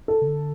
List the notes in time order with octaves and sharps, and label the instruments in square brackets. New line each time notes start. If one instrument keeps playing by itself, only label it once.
[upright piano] A4
[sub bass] C#3
D3